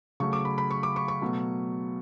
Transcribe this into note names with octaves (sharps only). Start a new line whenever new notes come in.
C#3 F#3 A3 C#6
D6
B5
B5
C#6
D6
C#6
C#6
B2 F#3 A3